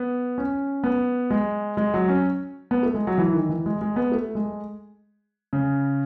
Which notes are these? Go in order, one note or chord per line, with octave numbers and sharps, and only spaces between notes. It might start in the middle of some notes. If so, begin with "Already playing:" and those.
Already playing: B3
C#4
B3
G#3
G#3
F#3
C#4
B3
A3
G#3
F#3
E3
D#3
E3
G#3
G#3
B3
A3
G#3
C#3